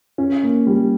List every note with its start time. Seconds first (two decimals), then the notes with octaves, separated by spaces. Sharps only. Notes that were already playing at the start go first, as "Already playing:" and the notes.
0.18 C#4
0.42 A#3
0.67 G3